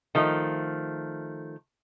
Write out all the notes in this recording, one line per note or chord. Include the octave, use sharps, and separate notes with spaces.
D#3 F3 A3